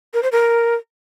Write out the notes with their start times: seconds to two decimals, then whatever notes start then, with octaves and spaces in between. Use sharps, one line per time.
0.14 A#4
0.23 C5
0.32 A#4